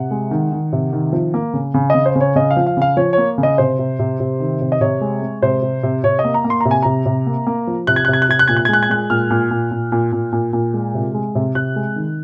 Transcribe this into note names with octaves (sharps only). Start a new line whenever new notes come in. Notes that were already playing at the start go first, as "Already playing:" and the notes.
Already playing: C3 F#5
G#3
D#3
D#3
C3
D#3
F3
A#3
C#3
C#3
C#3 D#5
C5
C#3 C#5
C#3 D#5
F5
F3
F5
C#3 F5
F3 C#5
A#3 C#5
C#3
D#5
C3 C5
C3
C3
C3
D#3
C3
D#5
C3 C#5
G#3
G#3
C3 C5
C3
C3
C3 C#5
D#5
A#3
A#5
A#3
C6
C3 A#5
G#5
C3 A#5
C3
A#3
A#3
F3
C3 F#6
G#6
C3 F#6
G#6
F#6
C3 G#6
F#6
A#2 G#6
F#6
G#6
G#3 F#6
G#6
G#3 F#6
A#2 F6
A#2
A#2
A#2
A#2
A#2
A#2
A#2
G#3
C3
G#3
C3
C3 F#6
G#3
D#3